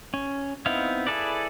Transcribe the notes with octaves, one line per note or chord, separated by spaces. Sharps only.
C#4
B3 C4 D#4 E4 F5
E4 G#4 A4 B4 D5